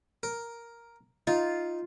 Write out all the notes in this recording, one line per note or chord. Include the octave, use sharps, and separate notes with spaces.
A#4
D#4 F4